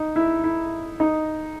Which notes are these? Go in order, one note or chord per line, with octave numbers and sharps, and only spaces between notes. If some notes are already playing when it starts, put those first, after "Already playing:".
Already playing: D#4
E4
E4
D#4